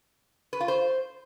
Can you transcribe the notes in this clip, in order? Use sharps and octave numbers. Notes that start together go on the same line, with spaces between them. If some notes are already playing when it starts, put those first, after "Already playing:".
B4
F4
C5